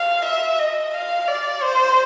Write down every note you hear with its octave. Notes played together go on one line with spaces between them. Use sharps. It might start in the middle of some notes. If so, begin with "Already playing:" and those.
Already playing: F5
E5
D#5
F5
D5
C5